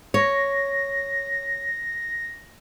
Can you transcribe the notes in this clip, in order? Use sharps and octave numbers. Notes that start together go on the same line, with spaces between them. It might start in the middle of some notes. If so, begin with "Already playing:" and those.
C#5 A#6